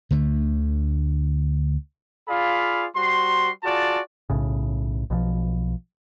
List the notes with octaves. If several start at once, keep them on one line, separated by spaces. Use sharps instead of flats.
D2 D3 A3
F4 G#4 D5 F5 B5
G3 F#4 C5 C6
F4 F#4 G#4 D5 A5
B1 A2 C#3
B1 B2 E3 F3